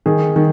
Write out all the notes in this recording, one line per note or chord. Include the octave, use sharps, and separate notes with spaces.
D#3 G#4
D#3